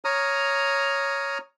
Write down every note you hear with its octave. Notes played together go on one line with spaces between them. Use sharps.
C#5 A#5 D#6 F6